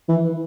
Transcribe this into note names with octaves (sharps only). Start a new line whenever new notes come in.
E3